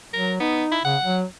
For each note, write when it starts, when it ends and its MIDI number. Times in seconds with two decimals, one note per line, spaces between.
0.14 0.39 54
0.14 0.34 70
0.40 0.64 59
0.40 0.76 63
0.72 0.81 64
0.85 0.96 49
0.85 1.17 78
1.04 1.24 54